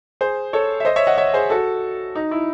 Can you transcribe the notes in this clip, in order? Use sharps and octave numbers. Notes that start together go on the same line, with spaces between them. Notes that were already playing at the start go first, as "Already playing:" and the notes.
G#4 C5
A4 C#5
E5
C5 D#5
C#5 E5
D#5 F#5
C#5 E5
G#4 C5
F#4 A4
D#4
E4